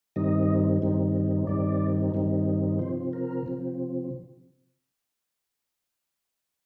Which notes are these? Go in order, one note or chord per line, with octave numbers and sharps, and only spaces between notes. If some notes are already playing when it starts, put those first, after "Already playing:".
G2 D#3 G3 C4 D#4 D#5
G2 D#3 G3 C4 D#4
G2 D#3 G3 C4 D#4 D5
G2 D#3 G3 C4 D#4
C3 F3 C4 C5
A#4
C3 F3 C4